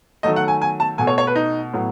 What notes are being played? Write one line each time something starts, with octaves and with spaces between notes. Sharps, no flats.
D#3 F#3 A3 D#5
F#5
G#5
G#5
A5
B2 A3 G#5
C#5
C#5
B4
D#4
A2 F#3 B3